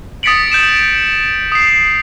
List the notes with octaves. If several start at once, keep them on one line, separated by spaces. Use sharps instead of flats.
D#6 A6 B6 C#7 D7 F#7
G6 D7 E7
D#6 C7